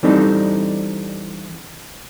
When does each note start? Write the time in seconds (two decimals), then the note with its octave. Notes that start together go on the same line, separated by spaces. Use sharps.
0.03 E3 G3 C4 D4 D#4 A4